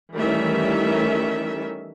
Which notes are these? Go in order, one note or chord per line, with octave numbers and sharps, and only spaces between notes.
D#3 E3 G3 A3 C#4 E5